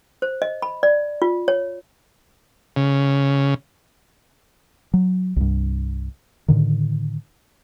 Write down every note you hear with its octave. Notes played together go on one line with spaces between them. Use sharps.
C5
D#5
B5
D5
F4
C#5
C#3
F#3
C2 G2
A2 D3 D#3